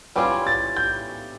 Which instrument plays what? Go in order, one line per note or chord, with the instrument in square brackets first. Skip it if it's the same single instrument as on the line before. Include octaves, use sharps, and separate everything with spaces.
[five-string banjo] E3 G3 C#4 F4 [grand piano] D6
[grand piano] A6
G6